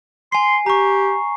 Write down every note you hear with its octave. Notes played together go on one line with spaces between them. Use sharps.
G#5 C6 C7
G4 A#5 C#6